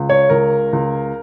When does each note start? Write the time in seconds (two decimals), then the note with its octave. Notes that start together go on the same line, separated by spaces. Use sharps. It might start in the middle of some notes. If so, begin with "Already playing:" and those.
Already playing: C#2
0.09 C#5
0.30 C#2 A#4
0.73 C#2